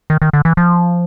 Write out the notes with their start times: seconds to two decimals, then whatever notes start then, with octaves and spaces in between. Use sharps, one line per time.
0.10 D#3
0.22 D#3
0.33 D3
0.45 E3
0.57 F3